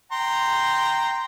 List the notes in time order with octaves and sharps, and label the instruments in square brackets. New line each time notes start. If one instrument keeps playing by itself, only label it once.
[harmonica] G5 A#5 C6